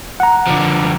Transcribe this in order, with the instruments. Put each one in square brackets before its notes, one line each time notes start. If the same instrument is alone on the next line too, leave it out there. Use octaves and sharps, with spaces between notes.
[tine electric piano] F#5 A#5
[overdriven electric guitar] D3 F3